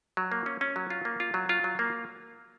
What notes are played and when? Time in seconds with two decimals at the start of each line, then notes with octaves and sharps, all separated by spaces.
0.17 F#3
0.32 A#3
0.46 C#4
0.61 C#4
0.76 F#3
0.90 F4
1.05 A#3
1.20 F4
1.34 F#3
1.49 F4
1.64 F#3
1.79 A#3